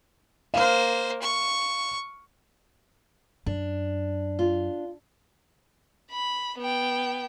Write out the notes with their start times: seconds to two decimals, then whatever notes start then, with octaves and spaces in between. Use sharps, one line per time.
0.54 A#3 C5 F5 F6
1.22 C#6
3.46 F#2 D4
4.39 F4
6.11 B5
6.58 B3 G5